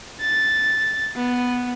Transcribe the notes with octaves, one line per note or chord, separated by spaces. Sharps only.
A6
B3